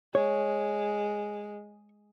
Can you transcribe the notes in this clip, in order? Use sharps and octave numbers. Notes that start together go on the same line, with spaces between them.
G#3 C#5